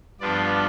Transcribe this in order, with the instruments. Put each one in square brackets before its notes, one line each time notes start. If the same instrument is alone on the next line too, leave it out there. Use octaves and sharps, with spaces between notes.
[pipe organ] G2 F3 B3 D4 F4 D5